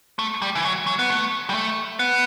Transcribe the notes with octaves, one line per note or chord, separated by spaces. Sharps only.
A3
G3
E3
F#3
F#3
B3
A3
G3
A3
B3